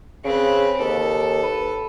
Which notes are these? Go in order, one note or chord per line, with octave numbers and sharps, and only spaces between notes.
C#3 C4 B4
D#2 A4
B4